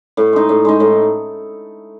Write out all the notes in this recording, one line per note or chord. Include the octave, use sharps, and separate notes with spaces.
A2
G#3 D#4
A2
G#3 D#4
A2